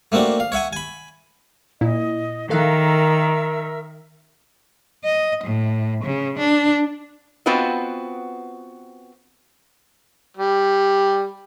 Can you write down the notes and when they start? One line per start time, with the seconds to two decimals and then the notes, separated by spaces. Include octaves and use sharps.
0.12 A3 A#3 C4 D4 F#4
0.40 F5
0.52 C#5 E5 F#5 G#5
0.73 G#5 B5
1.81 A#2 E4 D#5
2.50 D#3 A4 A#4 E5 F5 E6 F#6
5.04 D#5
5.44 A2
6.04 C#3
6.39 D4
7.46 B3 C4 F4 F#4 B4 D#5
10.37 G3